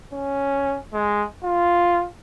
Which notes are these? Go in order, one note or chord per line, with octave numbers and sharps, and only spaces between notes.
C#4
G#3
F4